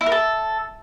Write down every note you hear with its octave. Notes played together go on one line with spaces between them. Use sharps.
E4
A#4
A4